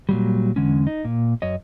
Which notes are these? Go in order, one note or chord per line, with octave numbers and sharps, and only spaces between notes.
A#2 F#3 G3
E2 D3 G#3 C#4
D#4
A#2
F#2 C#5 D#5